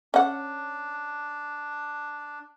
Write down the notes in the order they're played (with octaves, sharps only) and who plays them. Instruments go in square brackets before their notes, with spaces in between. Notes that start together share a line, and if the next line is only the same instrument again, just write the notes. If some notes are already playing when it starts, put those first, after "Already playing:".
[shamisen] C#4 F#5 [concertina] D4